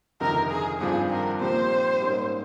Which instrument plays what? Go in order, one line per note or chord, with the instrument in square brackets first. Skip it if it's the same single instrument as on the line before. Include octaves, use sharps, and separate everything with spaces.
[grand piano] G1 F2 C3 D#3 [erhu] A#4
[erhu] G#4
[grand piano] G#1 G2 F3 C4 F4 [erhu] G#4
[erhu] A#4
[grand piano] A#2 F3 C4 G4 [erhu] C5
[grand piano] G#2 G3 A#3 C#4